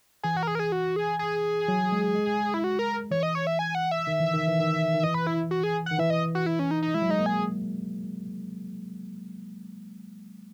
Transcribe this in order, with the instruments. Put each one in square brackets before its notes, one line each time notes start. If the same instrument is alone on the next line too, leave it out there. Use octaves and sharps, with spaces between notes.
[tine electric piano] E3 [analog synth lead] G#4
[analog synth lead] F#4
A#4
G#4
A#4
G#4
F#4
G#4
G#4
[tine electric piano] F#3
G#3
G#3
[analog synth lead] E4
F#4
A#4
[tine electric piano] E3 [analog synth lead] C#5
[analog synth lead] D#5
C#5
E5
G#5
F#5
E5
[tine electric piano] D#3
E3
D#3
E3
D#3
D#3
[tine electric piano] E3 [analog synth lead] D#5
[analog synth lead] B4
E4
F#4
G#4
[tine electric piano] D#3 [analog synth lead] F#5
[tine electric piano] E3 [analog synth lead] E5
[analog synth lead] D#5
F#4
E4
C#4
D#4
D#4
[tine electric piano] G#3 [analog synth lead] E4
[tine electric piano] F#3
[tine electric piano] G#3 [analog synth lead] D#4
[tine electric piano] A#3
[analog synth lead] G#4